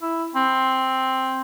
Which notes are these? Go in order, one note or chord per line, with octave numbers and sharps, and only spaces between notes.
E4
C4